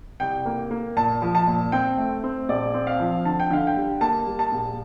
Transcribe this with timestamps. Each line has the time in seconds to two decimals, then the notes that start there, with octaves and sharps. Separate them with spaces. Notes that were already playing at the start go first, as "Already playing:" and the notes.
0.20 C2 G5
0.45 A#3
0.70 A#3
0.97 A#2 A5
1.22 F3
1.35 A5
1.47 A#2
1.72 C4 G5
1.98 A3
2.24 C4
2.49 A#1 D5
2.74 C4
2.87 F5
3.00 F3
3.25 D3 A5
3.40 G5
3.50 D3 F5
3.67 G5
3.77 G3
4.01 A#3 A5
4.27 G3
4.39 A5
4.52 A#1